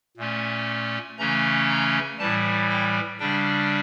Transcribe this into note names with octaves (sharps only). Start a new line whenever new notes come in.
A#2 A3 C#4
C#3 E3 A3 C#4 A#5
A#5
A2 E3 G3 A5
G5
C#3 G3 D4 G5